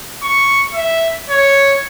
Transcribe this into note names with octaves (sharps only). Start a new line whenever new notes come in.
C#6
E5
C#5